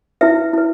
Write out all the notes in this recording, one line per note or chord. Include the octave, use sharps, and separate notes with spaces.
E4 B4 E5
E4 B4